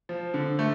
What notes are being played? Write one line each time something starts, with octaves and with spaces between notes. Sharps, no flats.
F3
D3
A3